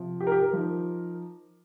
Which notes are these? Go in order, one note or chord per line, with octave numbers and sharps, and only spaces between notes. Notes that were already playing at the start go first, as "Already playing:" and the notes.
Already playing: C3 F3 C4
G4
A#4
G4
A#4
F3 D#4